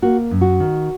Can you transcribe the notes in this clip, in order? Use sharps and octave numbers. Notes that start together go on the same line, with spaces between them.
A#3 F#4
F#2
F#4
D#3